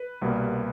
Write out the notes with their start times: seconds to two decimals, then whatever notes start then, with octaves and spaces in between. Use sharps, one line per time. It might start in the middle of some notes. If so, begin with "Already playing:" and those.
Already playing: B4
0.22 C2 B2 G3 A#3